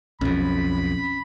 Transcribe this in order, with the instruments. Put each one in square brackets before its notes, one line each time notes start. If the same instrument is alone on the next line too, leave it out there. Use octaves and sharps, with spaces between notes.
[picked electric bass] B1 F2 [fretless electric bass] C#4 [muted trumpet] B5